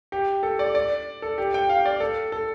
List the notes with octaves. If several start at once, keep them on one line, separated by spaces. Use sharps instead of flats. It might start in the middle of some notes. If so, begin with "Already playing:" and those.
G4
A4
D5
D5
A4
G4
G5
F5
D5
A4
A4